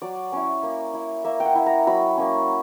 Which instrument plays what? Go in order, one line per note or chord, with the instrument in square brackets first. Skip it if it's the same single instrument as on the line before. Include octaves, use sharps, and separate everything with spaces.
[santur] F#3 D5
C#4 E4
A#3
E4
A#3 E5
G5
F#5
E4
A#5
F#3 B5
A#3 C#4